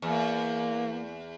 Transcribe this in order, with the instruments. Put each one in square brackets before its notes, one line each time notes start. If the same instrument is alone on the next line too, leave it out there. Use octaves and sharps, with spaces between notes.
[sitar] E2 [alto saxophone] A#3